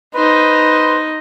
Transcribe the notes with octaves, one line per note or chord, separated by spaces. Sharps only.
D#4 B4 C5